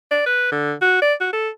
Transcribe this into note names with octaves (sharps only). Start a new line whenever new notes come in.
D5
B4
D3
F#4
D5
F#4
A4